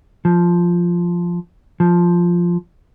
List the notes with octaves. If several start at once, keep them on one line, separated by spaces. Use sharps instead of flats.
F3
F3